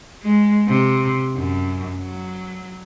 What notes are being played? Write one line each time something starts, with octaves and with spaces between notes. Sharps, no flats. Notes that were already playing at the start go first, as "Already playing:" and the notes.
G#3
C3
F#2
F#3